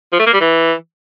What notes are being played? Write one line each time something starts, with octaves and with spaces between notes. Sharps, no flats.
F3
A3
A#3
G3
E3